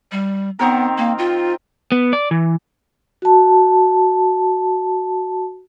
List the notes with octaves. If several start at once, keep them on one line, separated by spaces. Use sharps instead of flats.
G3
D#3 B3 C4 A#4
A#3
F4
B3
D5
E3
F#4 A5